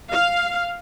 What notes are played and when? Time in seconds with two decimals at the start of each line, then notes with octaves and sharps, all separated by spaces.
0.12 F5